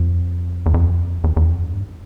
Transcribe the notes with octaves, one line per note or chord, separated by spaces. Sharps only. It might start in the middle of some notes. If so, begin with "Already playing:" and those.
Already playing: F2
E2
F2
E2
E2
F2
F#2
G2